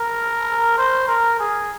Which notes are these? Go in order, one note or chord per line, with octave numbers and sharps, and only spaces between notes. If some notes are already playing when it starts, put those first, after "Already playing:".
Already playing: A#4
C5
A#4
G#4